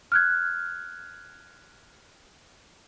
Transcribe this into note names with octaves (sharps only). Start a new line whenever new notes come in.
F6 F#6 G#6